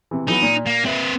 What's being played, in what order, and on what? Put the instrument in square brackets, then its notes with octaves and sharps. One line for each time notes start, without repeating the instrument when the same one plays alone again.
[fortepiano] C3 E3
[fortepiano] E3 F#3 B3 [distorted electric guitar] D#4
[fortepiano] A#2
[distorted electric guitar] A#3
[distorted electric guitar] C4 B4 [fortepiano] E5